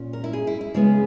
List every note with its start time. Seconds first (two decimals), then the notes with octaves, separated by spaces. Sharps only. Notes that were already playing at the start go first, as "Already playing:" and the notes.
Already playing: A#2 C#4
0.13 A#4
0.24 E4
0.33 G#4
0.47 E4
0.61 E4
0.74 C#3 G#3 B3 G#4